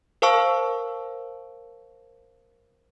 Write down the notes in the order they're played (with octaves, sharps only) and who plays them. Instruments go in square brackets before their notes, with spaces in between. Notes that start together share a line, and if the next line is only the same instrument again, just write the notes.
[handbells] A#4 C5 F5 A5 C#6 E6